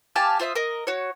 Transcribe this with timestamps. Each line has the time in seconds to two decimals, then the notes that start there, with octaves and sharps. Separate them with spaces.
0.16 G4 F5 G#5 A5
0.39 F4 C5 E5 D#6
0.55 A#4 D#5
0.87 F#4 C#5